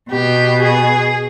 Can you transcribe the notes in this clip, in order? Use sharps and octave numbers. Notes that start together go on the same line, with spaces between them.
B2 G4
G#4